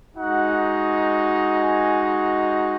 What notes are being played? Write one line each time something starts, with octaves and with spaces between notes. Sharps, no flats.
G#3 D#4 F#4 F#5
G#5